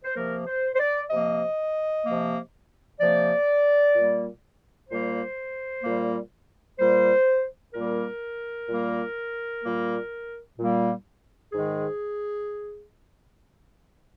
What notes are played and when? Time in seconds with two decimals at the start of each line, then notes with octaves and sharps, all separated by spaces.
0.04 C5
0.15 C3 F3 A#3 A#4
0.47 C5
0.74 C5
0.79 D5
1.09 C3 F3 A#3 D#5
2.05 C3 F3 A#3
2.99 C3 F3 A#3 D5
3.94 A#2 G3 A#3
4.89 A#2 G3 A#3 C5
5.83 A#2 G3 A#3
6.79 A#2 G3 A#3 C5
7.73 A#2 G3 A#3 A#4
8.68 A#2 G3 A#3
9.63 A#2 G3 A#3
10.58 A#2 G3 A#3
11.53 G#2 D#3 G#3 G#4